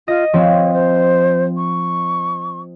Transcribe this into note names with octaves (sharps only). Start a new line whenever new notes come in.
F4 D#5
F3 C4 C#5
C5
C#6